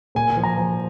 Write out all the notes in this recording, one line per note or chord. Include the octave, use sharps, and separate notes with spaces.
A#2 G#5
G#5
F3
A#5
F3